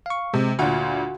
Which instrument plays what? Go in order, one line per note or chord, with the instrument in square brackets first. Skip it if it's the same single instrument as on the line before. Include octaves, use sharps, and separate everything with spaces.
[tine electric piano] F5 C#6
[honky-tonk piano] C3 [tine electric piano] G#3
[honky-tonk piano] D2 A#2 [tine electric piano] F#4 F#5